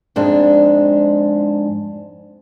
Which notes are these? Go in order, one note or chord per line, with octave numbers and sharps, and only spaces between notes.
F2 G#2 G#3 D4